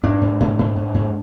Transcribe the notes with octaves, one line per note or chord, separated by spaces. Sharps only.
G#2 D4
G#2
G#2
G#2
G#2
G#2